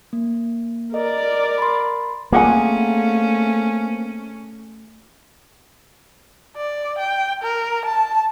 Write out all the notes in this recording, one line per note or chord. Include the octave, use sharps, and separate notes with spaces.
A#3
A#4 D5 D#5
B5 C6
A3 A#3 C4 C#4 G#4 F#5 G#5
D5
G5
A#4
A5